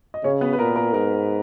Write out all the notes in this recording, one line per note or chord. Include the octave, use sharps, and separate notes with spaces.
D#5
C#3 C#4 C#5
B3 B4
B4
A#2 A#4
A#4
G#2 A#4